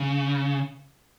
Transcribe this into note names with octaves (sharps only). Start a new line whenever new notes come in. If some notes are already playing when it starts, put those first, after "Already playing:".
Already playing: C#3